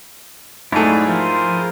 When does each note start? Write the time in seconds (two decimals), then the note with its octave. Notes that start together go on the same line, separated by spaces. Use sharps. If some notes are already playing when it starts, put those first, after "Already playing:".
0.72 G#2 F3 F#3 A3 D4 E4 G#4
1.08 F3 F4 A#4 C5